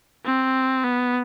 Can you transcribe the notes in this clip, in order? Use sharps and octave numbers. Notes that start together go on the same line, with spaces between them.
C4
B3